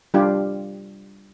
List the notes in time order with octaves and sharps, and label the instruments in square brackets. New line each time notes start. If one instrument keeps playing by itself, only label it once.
[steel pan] G3 D4 F4 G4